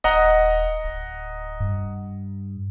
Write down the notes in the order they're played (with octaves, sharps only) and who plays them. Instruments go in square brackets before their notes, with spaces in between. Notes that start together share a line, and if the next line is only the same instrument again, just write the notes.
[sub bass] D#1 [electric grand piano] D#5 F#5 A#5
[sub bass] D1
G2